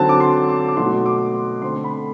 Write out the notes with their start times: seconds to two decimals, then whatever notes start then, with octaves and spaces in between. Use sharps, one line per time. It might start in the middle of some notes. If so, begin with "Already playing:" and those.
Already playing: D3 F#3 C4 A5
0.09 D6
0.20 C6
0.49 D6
0.68 D6
0.77 B2 F#3 A3 C6
1.06 D6
1.34 C6
1.62 D3 A3 C4 C6
1.84 B5